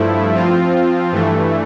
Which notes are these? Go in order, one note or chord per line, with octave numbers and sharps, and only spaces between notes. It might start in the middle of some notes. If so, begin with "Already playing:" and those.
Already playing: G2 F3 A3 E4
F3 C4 F4
G2 E3 A3